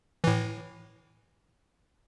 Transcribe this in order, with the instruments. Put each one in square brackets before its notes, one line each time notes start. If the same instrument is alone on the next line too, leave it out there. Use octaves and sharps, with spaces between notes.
[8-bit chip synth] A2 E3